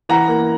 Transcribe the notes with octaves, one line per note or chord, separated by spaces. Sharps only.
E3 F#5 A#5
A#3